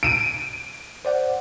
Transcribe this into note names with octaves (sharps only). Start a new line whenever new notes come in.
D7 D#7
C5 D5 F#5